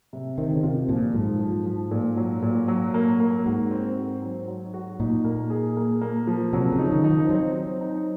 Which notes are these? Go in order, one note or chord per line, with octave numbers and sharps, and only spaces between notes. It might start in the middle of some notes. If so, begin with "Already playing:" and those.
C3
D#3 C4
C#3
C3 F4
A#2 F3
G#2 F3
F3
F3
A#2
F#3
A#2
F#3
A#3
A#3
G#2 F#4
C4
F#4
F#3
F#3
F#4
A#2 D#4
A#3
G#4
A#3
A#3
F3
C3 F#3
C#3
D#4
D#3
D#4
F3
F#3 C4
C4
D#4